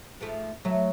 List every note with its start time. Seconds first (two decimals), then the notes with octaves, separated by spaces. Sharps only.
0.21 G#2 F3 A3
0.65 F#3 A3